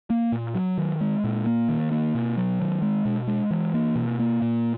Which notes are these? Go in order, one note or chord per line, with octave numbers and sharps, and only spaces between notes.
A#3
A#2
F#3
D#3
G#3
A#2
A#3
D#3
A#3
B2
F#3
D#3
G#3
B2
G#3
E3
A#3
B2
A#3
A#2